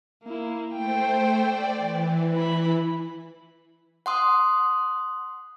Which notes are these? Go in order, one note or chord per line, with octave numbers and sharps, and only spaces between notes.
A#3 E4
A3 C5 G5
D5
E3
E4 B5
F#5 C6 D#6